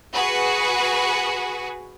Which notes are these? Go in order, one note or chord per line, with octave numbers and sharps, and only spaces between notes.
F#4 G#4 B4